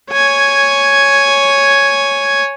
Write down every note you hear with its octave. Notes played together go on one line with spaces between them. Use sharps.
C#5 G#5